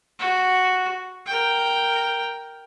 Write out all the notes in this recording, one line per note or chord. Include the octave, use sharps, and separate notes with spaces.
F#4
A#4 G5